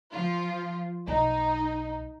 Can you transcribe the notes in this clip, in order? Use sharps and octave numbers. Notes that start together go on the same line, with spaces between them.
F3 F4
B1 D#4